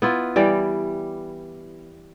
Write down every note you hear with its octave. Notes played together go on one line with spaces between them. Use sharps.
B3 E4 F4
E3 G3 D5